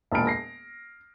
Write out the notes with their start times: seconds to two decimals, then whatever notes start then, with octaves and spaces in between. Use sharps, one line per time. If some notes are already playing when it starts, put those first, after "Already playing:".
0.12 E1 A#2 A5 B5 F6 D7
0.27 A#6 C7